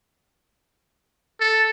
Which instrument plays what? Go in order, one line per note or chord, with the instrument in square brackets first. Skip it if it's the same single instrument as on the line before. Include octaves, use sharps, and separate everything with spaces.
[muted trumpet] A4